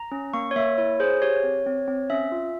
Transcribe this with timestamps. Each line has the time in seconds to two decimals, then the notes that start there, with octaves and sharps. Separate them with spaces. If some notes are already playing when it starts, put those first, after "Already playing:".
Already playing: A#5
0.12 C#4
0.34 A#3 C#6
0.51 C#5
0.56 A#3 E5
0.78 E4 C#5
1.00 G#4 C5
1.22 G4 C#5
1.43 C4
1.66 C4
1.88 C4
2.10 C#4 E5
2.32 F4